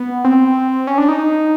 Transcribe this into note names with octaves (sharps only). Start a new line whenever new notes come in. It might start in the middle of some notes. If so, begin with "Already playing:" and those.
Already playing: B3
C4
C#4
D4
D#4